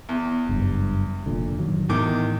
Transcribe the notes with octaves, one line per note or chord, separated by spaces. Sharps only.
E2
F#1 G2
F1 A#2 D3
A1 D#3 F#3
E2 A2 D#3 E3 D6